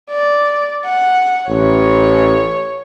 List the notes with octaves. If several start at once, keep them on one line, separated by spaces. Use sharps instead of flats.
D5
F#5
A1 C#5